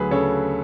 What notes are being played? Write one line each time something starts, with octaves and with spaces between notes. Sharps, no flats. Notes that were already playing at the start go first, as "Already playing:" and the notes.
Already playing: D2 F#3 G#4 B4
C#3 A4 C#5